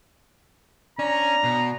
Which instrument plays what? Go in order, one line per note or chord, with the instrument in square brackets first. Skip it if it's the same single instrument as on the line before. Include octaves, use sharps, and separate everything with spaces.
[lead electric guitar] C#4 [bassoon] D4 [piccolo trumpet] A#5
[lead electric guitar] B2